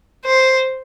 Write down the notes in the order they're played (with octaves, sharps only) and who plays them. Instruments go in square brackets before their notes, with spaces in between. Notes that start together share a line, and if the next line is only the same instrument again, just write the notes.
[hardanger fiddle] C5